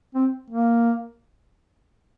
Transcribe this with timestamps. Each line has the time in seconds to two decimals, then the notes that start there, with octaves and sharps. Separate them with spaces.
0.15 C4
0.50 A#3